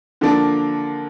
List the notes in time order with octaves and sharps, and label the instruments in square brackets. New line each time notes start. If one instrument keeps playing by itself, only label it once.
[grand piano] D3 F3 A#3 D4